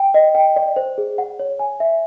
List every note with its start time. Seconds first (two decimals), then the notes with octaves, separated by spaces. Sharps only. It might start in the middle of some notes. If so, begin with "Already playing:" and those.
Already playing: G5
0.14 D#5
0.35 G5
0.56 D5
0.76 C5
0.98 G#4
1.18 F#5
1.39 C#5
1.59 G#5
1.80 E5